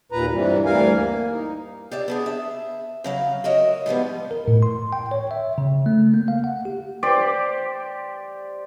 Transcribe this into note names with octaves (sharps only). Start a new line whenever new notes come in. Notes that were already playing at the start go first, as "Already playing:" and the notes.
D#2 A#2 B4 A#5
G2 C3 E3 G3
D2 E3 G3 A#4 F5 G#5
A#3
D#4
G4 D5 E5
B3 D4 G#4
E5
C#3 F#3 F5
F#4 A#4 C#5 D#5 E5
G#2 F3 G3 B3
A#4
A2
C6
G5
C#5
E5
C#3
A3
A#3
F5
F#5
G4
G4 C5 D5